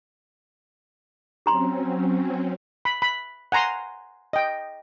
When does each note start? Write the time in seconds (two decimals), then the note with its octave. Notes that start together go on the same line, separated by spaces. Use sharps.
1.46 F#3 C4 C#4 G4 A#5 C6
2.85 B5
3.02 B5
3.52 F#5 G#5 A#5 C6
4.33 D#5 G5